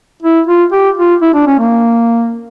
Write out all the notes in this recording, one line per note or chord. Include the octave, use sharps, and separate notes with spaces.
E4
F4
G4
F4
E4
D4
C#4
A#3